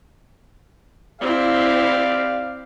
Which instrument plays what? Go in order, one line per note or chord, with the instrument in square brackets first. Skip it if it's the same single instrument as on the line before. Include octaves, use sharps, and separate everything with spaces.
[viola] C4 E4 [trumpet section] G4 D5 F5